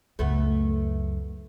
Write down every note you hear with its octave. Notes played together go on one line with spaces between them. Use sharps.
C#2 F#2 A3 B3